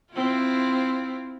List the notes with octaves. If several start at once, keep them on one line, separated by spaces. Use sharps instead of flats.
C4 E4 F4